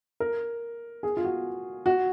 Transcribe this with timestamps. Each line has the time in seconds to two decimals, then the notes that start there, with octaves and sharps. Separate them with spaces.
0.20 A#4
1.03 G#4
1.17 F4
1.24 F#4
1.86 F#4